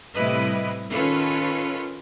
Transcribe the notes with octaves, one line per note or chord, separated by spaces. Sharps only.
A2 C3 G3 E4 B4 D#5
D#3 C#4 F4 A4 B4 C#5